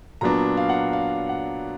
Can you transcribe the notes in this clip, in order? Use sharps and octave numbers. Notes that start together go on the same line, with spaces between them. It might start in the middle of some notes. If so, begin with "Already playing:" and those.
A#2 F#3 B3 D4 A#5
F5
F#5
F5
F#5